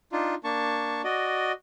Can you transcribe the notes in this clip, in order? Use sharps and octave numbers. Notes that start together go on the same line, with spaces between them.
D4 D#4 F4
A#3 D4 A5 C#6
F#4 D5 D#5